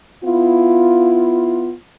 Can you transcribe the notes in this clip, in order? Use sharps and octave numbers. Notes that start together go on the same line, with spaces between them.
B3 E4 F4